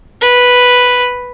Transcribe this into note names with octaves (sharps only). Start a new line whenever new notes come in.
B4